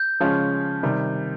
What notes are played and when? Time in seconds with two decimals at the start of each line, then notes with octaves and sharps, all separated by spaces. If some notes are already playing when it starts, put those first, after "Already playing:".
Already playing: G6
0.20 C#3 F3 G#3 C#4 F4
0.83 C3 D#3 G3